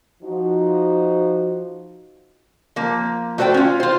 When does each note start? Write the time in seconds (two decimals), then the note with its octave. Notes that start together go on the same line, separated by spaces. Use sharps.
0.23 F3 D#4 F#4
2.76 F3 A#3
3.38 A3 F#4 C5 D5 G5
3.54 C#4 F4
3.80 F4 C5